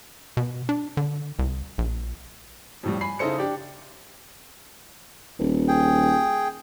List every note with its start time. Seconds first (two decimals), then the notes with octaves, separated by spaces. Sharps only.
0.37 B2
0.69 D4
0.97 D3
1.39 C2
1.78 A#1
2.83 F2 A2 G3
3.01 G#5 B5 C7
3.19 C#3 D#4 E4 A4 C5 C#7
3.38 D4 G4 D5
5.39 D#1
5.68 G#4 G5